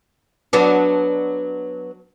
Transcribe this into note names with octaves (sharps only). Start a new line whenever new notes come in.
F#3 B3 D4